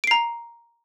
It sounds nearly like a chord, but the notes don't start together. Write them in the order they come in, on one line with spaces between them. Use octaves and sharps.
D7 C7 A#5